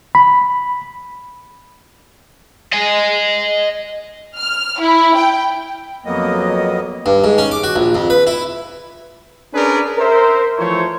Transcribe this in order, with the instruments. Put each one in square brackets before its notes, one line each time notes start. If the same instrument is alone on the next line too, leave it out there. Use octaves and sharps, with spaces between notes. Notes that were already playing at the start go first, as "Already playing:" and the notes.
[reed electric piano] B5
[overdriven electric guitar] D#5 G#5
[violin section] F6
E4
G5
[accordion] F2 F#3 A#3 B3 D#5
[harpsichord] G2
G#2
C#4
D6
F#4
A#1
F2
B4
E4
[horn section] C#4 D4 G#4 A#4 B4 D5
A#4 C5 E5
E3 F3 A3 C5 C#5